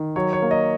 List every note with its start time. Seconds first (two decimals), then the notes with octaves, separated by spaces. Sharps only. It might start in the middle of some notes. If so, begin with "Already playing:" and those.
Already playing: D#3
0.16 F#3 C#5
0.33 C#5
0.42 A#3
0.51 D#5